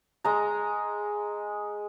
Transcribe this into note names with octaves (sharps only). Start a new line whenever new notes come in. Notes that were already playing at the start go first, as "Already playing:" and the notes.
G#3 A#5